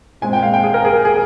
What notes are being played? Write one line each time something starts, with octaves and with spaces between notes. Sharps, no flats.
A#2 G#3 C4 G#5
G5
F5
G5
G#4
A#4
G#4
G#4